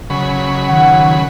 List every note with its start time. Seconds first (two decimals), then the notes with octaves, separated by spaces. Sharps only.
0.10 C#3 F#3 B5
0.68 D#3 F#5